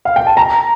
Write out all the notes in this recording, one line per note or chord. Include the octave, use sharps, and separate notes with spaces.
F5
G5
A5
A#5